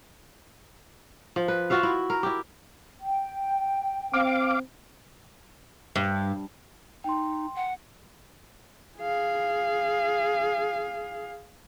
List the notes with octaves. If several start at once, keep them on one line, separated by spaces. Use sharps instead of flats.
F3
B4
F4 F#4 E5 F5
E4
A#4
E4 G4
G5
C4 F5 D6
G2
D#4 G5 C6
F#5
G#4 F5